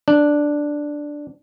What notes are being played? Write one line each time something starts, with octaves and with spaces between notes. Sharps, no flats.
D4